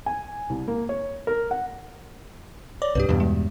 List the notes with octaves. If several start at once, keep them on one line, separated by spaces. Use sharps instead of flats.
G#5
C2
A#3
C#5
A#4
F#5
C#5 D5 D6
C2 G2 G4 B4
E2 G2 B2
G#3